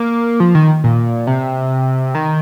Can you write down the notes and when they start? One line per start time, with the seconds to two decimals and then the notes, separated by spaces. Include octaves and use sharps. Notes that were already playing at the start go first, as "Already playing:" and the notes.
Already playing: A#3
0.40 F3
0.55 D#3
0.84 A#2
1.27 C3
2.15 D#3